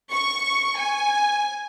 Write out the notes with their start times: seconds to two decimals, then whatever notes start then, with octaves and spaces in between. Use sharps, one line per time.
0.11 C#6
0.78 G#5